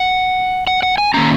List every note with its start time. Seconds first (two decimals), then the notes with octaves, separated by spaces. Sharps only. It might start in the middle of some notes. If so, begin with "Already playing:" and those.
Already playing: F#5
0.67 F#5
0.83 F#5
0.98 G#5
1.14 D#3 A#3 C#4 A#5